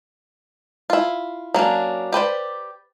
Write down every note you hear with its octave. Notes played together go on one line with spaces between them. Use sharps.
E4 F4
F#3 A#3 C#4 D4
G4 B4 C5 D5